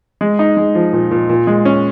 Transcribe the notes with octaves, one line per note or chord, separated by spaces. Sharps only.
G#3
D#4
G#3
F3
A#2
A#2
A#2
G#3
C#4